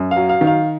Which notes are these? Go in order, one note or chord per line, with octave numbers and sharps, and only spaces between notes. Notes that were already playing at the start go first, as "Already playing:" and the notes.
Already playing: F#2
F5
F#3
F5
D#3
F5